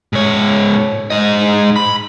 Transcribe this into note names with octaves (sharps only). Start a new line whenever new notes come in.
G#2 C#5
G#2 D#5
B5